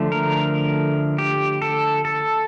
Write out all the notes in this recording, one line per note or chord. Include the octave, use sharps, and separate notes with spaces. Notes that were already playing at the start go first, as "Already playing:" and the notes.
Already playing: D3 F3 A3
A#4
G4
A4
A4